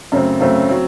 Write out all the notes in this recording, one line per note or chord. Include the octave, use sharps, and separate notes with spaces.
F#2 C#3 A3 C4
F#2 C#3 A3 C4
F#3 C4